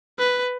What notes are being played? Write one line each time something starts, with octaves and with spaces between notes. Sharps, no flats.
B4